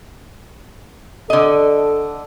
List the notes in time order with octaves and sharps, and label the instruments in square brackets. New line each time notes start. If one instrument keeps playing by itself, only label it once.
[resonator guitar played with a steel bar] D3 D#5 [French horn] A4